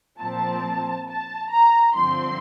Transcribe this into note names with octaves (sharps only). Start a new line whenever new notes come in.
A#2 F3 C4 A5
A5
A#5
G2 D3 F3 C4 C6